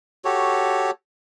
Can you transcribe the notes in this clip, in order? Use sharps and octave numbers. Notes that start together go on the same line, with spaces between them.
F#4 G4 A4 C#5